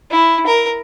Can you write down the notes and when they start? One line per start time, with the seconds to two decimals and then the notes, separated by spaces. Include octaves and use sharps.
0.11 E4
0.47 A#4